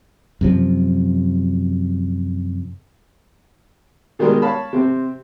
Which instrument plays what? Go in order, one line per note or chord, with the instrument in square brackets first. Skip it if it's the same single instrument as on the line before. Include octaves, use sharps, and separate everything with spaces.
[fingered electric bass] F#2 C3 F3
[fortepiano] B2 D#3 G3 G#3 A#4
C#5 F5 A5 B5
C3 C4